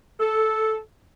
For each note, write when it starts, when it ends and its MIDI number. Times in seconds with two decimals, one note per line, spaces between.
0.19 0.76 69